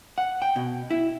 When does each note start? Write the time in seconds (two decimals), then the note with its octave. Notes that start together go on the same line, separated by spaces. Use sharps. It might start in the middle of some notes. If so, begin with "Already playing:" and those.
0.18 F#5
0.42 G5
0.56 B2
0.90 E4